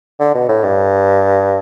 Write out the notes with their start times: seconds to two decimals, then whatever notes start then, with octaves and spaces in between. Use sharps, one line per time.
0.20 D3
0.34 B2
0.48 A2
0.64 G2